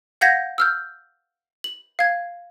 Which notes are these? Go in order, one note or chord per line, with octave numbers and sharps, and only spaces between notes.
F5 F#5 G6 G#6 A#6 B6
E6 F6 G6
F#7
F5 G#6